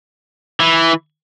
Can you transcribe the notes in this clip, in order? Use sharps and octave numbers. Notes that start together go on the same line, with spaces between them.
E3